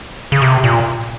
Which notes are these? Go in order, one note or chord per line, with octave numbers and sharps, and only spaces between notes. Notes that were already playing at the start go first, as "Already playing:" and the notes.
C#3
C3
A#2